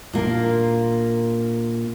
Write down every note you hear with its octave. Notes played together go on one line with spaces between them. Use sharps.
A#2 A#3 D4 F4